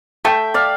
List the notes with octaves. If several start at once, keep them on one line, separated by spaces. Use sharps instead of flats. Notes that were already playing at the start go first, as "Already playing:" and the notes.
A3 E5 G5
D5 F5